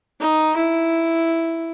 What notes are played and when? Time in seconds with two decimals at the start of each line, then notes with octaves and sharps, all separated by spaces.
0.20 D#4
0.56 E4